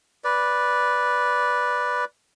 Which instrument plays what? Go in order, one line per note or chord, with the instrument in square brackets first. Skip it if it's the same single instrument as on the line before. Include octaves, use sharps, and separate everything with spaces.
[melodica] B4 D5